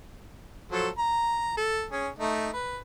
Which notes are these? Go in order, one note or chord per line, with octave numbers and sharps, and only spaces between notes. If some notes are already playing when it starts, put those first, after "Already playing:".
F3 F#3 A4
A#5
A4
C#4 G#4
A3 D#4
B4